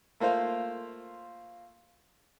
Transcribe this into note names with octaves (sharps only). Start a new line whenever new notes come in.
A3 A#3 F4 C5 F5